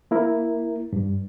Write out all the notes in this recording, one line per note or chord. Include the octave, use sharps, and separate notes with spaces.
A#3 E4 A#4
G2